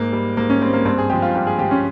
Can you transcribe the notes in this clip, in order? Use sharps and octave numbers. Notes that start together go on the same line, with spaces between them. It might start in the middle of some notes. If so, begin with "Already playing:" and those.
Already playing: G#2 A#3
G3
G#2 A#3
C#4
G3 C4
A#3
G2 C4
G#4
F3 G#3 G4
F4
G2 G4
G#4
F3 G#3 G4
C#4